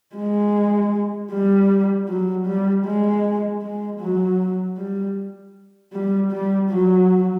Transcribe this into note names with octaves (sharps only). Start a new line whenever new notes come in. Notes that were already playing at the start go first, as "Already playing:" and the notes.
G#3
G3
F#3
G3
G#3
G#3
F#3
G3
G3
G3
F#3